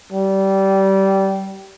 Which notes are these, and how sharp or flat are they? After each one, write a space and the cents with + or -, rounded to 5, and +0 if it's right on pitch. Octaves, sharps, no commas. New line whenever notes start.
G3 -20